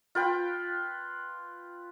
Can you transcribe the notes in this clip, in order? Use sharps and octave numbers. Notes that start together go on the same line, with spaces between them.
F4 B4 G5